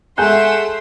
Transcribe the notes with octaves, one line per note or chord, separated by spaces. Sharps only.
G#3 A3 E5 F#5 G#5 C6 G6 E7